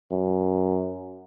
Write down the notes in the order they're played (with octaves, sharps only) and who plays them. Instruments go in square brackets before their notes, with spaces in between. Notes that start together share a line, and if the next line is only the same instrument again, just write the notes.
[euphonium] F#2